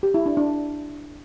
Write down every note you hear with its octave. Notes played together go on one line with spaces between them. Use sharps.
G4
E4
D4
D4